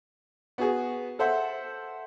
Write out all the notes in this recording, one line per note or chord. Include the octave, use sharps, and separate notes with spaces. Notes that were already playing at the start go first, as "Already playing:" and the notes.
B3 F#4 G#4
A4 C5 E5 F#5